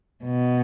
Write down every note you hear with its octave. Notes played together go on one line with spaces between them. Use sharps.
B2